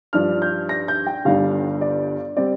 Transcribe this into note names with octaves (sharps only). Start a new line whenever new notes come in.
G2 F3 D4 F6
G6
A#6
G6
G5
G1 G2 G3 D4 F5
D5
G3 C4 D5